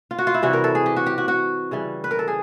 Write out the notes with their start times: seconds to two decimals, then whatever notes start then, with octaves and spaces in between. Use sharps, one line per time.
0.11 F4
0.18 F#4
0.27 F4
0.34 E4
0.42 C3 E3 G3 F#4
0.53 A#4
0.64 A4
0.75 G#4
0.86 G4
0.96 F#4
1.06 G4
1.18 F#4
1.28 F#4
1.71 C#3 E3 G3
2.04 B4
2.11 A#4
2.19 A4
2.28 G#4